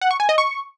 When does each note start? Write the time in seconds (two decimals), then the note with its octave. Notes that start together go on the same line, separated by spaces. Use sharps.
0.01 F#5
0.11 C#6
0.20 G#5
0.29 D#5
0.38 C#6